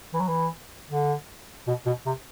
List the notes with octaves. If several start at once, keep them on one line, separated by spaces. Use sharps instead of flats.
E3
F#3
E3
D3
B2
B2
C3